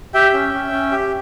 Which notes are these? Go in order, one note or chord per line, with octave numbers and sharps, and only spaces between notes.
G4 E5 G5
C#4
C#4
C#4
G4